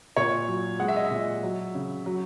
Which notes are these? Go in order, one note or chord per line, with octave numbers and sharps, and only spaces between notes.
A#2 C#5
F#3
G#3 F#5
E5
D#5
E5
A#2
F#3
C#3
F#3